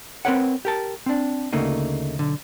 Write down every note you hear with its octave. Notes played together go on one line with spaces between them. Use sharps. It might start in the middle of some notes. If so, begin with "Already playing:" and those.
C4 D#4 A#4 B4 C#5 F#5
G4 A#4 A5
C4 D4
D2 C#3 A3 A#3 D#4
B1 D3